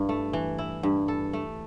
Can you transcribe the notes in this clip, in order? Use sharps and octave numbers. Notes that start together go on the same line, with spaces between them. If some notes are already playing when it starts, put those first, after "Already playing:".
Already playing: G2 E4
A3
E3
E4
G2
A4
A3